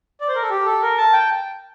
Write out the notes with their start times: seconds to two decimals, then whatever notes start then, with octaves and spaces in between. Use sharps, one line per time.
0.21 D5
0.28 C5
0.35 A#4
0.42 A4
0.50 G4
0.66 A4
0.82 A#4
0.97 A5
1.13 G5